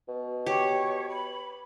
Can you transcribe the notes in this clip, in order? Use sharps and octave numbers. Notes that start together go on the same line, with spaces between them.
B2
G4 C#5
B5